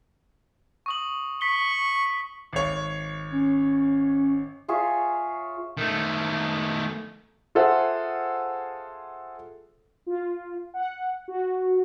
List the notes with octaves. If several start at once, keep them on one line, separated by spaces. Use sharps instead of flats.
C#6 D#6 F#7
C#6 B6 G7
G#1 C#5
C#4
F4 G#4 C#5 E5
D#3 A3
F4 G#4 A4 C5 E5 F#5
F4
F#5
F#4